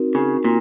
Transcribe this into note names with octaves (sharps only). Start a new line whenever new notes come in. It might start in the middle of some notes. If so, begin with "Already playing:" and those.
Already playing: C4 D#4 F#4 A#4
C#3
A#2